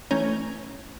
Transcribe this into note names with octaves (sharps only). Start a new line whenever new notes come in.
E3 A3 C#4 G#5 A#5 G6